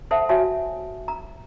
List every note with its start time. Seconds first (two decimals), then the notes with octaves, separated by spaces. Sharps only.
0.11 A4 C5 E5 F#5 A5
0.29 F#4 C#5 E5 G#5 A5
1.08 A#5